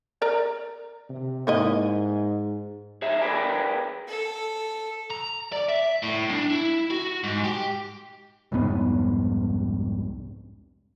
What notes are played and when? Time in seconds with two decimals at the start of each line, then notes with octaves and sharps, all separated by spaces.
0.22 A#4 D5 A#5
1.09 C3
1.47 G#2 A#3 E4 D#5
3.02 G#4 C#5 E5
3.22 G#4 A#4 B4 D5 G5 G#5
4.08 A4
5.10 A#5
5.52 D5
5.69 E5
6.03 A2
6.31 D4
6.50 E4
6.90 F#4
7.24 G#2
7.44 G4
8.52 C2 F2 G#2 B3